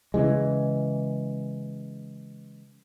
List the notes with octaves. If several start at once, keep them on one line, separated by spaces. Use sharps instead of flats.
C#3 E3 G#3